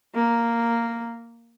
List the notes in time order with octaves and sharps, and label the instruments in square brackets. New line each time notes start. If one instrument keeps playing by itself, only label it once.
[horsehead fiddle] A#3